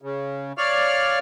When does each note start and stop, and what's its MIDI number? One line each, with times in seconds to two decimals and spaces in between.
0.02 0.52 49
0.58 1.19 73
0.58 1.19 74
0.58 1.19 77
0.58 1.19 89